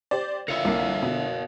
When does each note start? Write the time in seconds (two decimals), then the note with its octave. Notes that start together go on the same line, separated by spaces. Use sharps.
0.11 G4 C5 D5
0.48 D3 F4 A#4 C#5 E5 F5 C#7 F7
0.65 C2 A#3
1.03 B2